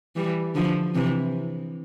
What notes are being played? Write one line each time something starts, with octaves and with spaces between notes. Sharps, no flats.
E3 G3
D3 F3
C3 E3